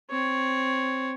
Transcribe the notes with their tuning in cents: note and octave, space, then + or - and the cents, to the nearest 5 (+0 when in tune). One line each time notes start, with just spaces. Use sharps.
C4 +0 C#5 +0